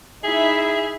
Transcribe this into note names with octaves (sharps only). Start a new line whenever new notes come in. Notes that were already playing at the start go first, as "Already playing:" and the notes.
D#4 E4 G#4 E5